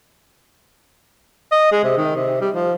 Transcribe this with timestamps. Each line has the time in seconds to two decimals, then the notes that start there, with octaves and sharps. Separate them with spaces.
1.52 D#5
1.72 G#3
1.84 C3
1.98 D#3
2.16 C3
2.41 G3
2.55 F3